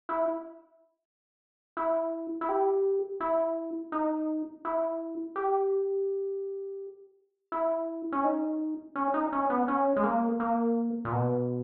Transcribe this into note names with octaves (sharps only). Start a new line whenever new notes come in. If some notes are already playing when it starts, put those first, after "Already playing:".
E4
E4
E4
G4
E4
D#4
E4
G4
E4
C#4
D#4
C#4
D#4
C#4
B3
C#4
G#3
A#3
A#3
A#2
B2